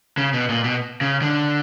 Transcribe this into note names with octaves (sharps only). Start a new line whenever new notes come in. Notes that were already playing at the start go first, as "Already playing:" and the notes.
C#3
B2
A#2
B2
C#3
D3